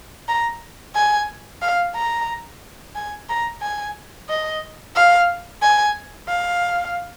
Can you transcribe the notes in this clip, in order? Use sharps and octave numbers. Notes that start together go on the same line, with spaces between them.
A#5
G#5
F5
A#5
G#5
A#5
G#5
D#5
F5
G#5
F5